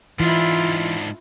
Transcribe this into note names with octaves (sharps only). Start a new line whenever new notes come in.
G#2 E3 D4 E4 F4